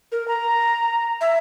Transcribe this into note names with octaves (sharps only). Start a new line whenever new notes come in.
A#4
A#5
E5